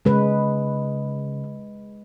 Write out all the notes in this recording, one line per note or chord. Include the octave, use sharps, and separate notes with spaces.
C#3 G#3 B4